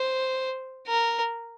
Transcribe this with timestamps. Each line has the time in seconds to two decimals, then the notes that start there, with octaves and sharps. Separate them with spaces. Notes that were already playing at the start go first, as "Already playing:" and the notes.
Already playing: C5
0.88 A#4